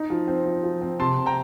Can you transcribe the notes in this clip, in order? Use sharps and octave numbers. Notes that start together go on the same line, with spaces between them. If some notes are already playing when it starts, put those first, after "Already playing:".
Already playing: D#4
F3
C4
F3
F3
C4
C3 A5 C6
C3
G5 A#5